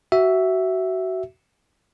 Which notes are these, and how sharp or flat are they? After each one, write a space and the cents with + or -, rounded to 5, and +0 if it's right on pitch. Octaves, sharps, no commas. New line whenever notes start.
F#4 +25 E5 +0